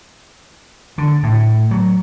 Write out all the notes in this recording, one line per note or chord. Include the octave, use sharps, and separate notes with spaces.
D3
A2
F#3